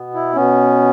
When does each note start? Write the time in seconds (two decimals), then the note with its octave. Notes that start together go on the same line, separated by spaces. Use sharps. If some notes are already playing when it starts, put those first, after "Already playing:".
Already playing: B2 B3
0.14 E4
0.36 B2 B3 C#4